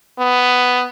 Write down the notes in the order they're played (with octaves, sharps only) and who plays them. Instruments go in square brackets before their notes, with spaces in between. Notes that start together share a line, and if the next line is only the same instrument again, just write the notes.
[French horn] B3